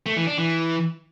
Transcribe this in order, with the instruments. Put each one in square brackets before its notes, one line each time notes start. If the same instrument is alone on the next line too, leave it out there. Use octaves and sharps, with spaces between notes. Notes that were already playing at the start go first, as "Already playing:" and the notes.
[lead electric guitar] A3
E3
D4
E3